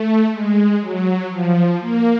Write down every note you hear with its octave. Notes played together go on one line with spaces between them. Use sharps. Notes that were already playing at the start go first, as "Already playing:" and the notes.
Already playing: A3
G#3
F#3
F3
A#3